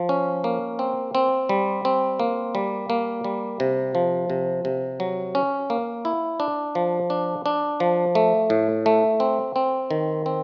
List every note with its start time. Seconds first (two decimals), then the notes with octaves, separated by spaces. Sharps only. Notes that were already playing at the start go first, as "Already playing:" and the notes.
Already playing: F3
0.09 C#4
0.44 A#3
0.79 C4
1.15 C4
1.49 G3
1.85 C4
2.20 A#3
2.55 G3
2.90 A#3
3.24 G3
3.60 C3
3.95 F3
4.30 C3
4.65 C3
5.00 F#3
5.35 C#4
5.70 A#3
6.05 E4
6.40 D4
6.75 F3
7.10 D4
7.46 D4
7.80 F3
8.15 A3
8.50 A2
8.86 A3
9.20 C4
9.56 C4
9.91 D#3
10.26 C4